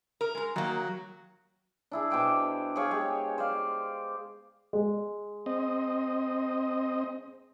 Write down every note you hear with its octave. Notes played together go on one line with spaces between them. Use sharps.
A#4
G#3 A#4
D#3 F#3 A#3
D4 E4 G#4
B2 C5 G5 D6
G#4 C#5 F5
G#3 G4
C5 D5 F5
G#3
C4 D#5